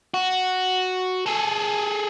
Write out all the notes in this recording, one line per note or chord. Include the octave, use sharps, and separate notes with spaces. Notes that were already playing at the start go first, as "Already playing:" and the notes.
F#4
G#4 A4